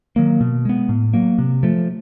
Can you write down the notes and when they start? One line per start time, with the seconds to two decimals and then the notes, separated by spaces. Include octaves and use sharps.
0.16 D#3 F#3 A#3
0.41 B2
0.65 G#3 B3
0.89 A2
1.13 F#3 A#3
1.38 C3
1.63 F3 A3